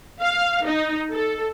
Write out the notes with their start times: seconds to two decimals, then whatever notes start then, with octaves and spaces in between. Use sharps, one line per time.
0.21 F5
0.64 D#4
1.12 A4